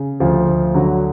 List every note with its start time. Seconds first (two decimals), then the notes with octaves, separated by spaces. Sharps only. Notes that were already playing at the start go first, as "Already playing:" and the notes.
Already playing: C#3
0.20 D2 F3 F4
0.48 D2
0.75 D3 F#3 F#4